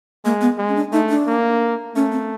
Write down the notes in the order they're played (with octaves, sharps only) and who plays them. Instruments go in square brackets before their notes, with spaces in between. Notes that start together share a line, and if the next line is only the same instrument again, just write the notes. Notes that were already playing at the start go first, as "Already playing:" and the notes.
[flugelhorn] G#3 [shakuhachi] A#3
[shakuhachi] B3
[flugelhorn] G#3
[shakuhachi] C#4
D4
[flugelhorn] A3 [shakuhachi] D#4
[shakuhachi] D4
[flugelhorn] A#3
[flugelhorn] A3 [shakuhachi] C#4
[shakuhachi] C4